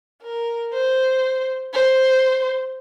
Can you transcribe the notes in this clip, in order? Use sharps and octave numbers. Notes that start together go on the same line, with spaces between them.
A#4
C5
C5